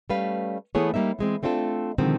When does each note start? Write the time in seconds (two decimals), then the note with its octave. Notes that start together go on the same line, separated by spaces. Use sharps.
0.10 G3 A3 C#4 B4 F5
0.75 E3 A3 B3 E4 G#4 C#5
0.94 G3 A#3 D#4 E5
1.19 E3 G#3 C4
1.43 A3 C4 D4 F4 A4
1.98 B2 D3 D#3 F3 G#3 C4